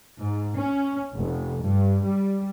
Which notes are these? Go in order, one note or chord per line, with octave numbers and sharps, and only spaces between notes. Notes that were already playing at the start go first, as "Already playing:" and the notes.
G#2
C#4
F1
G2
G3